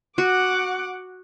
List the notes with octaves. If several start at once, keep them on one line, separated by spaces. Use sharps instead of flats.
F#4 F#5 D6